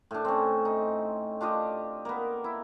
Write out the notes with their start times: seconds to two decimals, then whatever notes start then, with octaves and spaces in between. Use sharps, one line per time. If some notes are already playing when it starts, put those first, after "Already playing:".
0.11 A2 D4
0.25 C4 C#4
0.65 D#4
1.41 D4 F4 G4 D#5
2.05 A#3 B3
2.44 E4